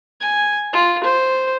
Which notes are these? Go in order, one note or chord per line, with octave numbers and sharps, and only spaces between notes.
G#5
F4
C5